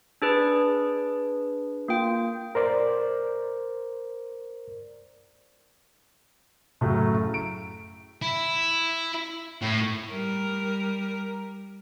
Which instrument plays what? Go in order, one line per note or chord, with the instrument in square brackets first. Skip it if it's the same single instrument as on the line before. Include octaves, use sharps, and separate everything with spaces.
[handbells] D4 G#4 B4
A#3 F4 G5
[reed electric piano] A#4 C5 D5
[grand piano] F#2 A2 C#3 F#3 A3
D7
[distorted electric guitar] E4
A2
[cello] G3 A#4